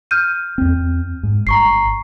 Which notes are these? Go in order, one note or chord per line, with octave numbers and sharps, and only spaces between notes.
F6 G6 D#7
E2 C4
G#2
G1 A#5 C#6 C7